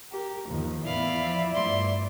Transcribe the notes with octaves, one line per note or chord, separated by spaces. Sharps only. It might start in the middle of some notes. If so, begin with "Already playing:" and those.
G4 A#4
D#2 D#3 F3
E2 A2 E4 D5 F5 B5
F3
G2 F3 A3 C6